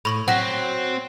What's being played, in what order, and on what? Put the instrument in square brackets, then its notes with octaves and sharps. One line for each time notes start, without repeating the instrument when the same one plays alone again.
[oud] A2 [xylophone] B5 C#6 F#7
[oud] F#3 [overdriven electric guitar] C4 [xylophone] F#5 A#6 B6